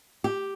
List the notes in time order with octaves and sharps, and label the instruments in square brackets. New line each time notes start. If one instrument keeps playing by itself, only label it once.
[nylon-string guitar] G4